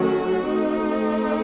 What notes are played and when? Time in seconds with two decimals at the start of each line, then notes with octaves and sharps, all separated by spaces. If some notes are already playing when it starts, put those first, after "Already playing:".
Already playing: D#3 F#3 A3 C#4 F#4
0.47 A3 C4 D#4